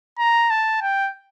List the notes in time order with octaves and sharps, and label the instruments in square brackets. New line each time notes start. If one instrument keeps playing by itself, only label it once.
[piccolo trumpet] A#5
A5
G5